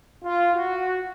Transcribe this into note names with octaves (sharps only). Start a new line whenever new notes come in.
F4
F#4